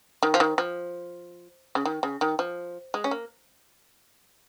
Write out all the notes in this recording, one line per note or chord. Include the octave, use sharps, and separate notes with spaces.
D#3
F3
D#3
F3
C#3
D#3
C#3
D#3
F3
G#3
C#4
A#3